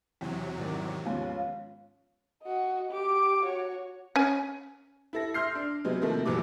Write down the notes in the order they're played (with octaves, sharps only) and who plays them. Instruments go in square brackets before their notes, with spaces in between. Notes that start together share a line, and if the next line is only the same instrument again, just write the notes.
[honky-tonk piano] E2 [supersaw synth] C3 F#3
[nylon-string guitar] G#2 D#3 D5
[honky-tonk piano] D#2 G#2 [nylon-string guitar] F3 B3 C#4 [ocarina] F5
[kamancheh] F#4 D#5
G4 D6
F#4 C#5
[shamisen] C#4 G#5
[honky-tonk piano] E4 A4 A#6
E5 C6 F6 G6 C7
D4
C3 F#3 G#3 B3
D#2 C3 D#3 F3 A3 A#3
F1 A#1 D#2 E3 F#3 D6